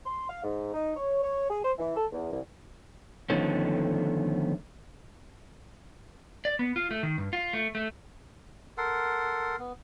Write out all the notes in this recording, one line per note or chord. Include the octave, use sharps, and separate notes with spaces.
C6
F5
G#2
D#4
C#5
C#5
G#4
C5
E3
A4
E2
C2
D3 D#3 F3 A3 B3 C#4
D5
B3
F4
A3
D#3
G2
F4
A3
A3
A4 A#4 F#5 C6
B3